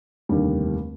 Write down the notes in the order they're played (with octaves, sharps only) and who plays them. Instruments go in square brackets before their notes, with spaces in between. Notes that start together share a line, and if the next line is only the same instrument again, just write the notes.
[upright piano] F1 D#2 D3 G3